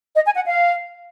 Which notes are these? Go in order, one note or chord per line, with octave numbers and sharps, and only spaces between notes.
D#5
G#5
F#5
F5